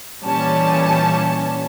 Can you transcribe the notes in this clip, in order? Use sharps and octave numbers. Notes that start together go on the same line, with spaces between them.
A#2 E3 G3 C#4 A5